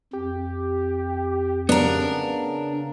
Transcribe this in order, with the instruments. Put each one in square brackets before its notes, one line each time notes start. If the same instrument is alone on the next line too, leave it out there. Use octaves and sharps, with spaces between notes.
[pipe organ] F2 [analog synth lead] G4
[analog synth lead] C#3 [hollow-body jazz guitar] B3 [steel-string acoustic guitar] D4 A#4